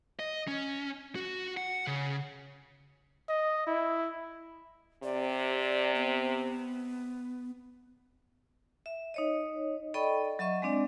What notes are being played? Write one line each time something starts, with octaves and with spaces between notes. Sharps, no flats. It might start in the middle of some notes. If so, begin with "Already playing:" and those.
D#5
C#4
F#4
F#5
C#3
D#5
E4
C3 D5
B3
E5
D#4 C#5 D#5
A4 D5 D#5 G5 B5 C#6
F#3 D#5 E5 C#6
G#3 C4 D4 D5